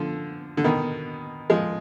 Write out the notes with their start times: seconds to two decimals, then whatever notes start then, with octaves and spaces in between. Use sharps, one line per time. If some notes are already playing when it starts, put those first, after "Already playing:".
Already playing: D3 F3
0.57 D3
0.64 B2 D#3
1.50 F3 G#3